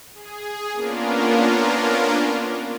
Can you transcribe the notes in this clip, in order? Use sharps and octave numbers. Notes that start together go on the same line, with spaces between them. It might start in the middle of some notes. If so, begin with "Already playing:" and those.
G#4
A#3 B3 C#4 D4 F4 A#4